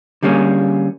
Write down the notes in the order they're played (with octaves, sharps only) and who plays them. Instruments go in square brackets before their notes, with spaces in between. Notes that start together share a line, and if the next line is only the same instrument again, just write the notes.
[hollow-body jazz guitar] D3 G3 A#3 C#4 G#4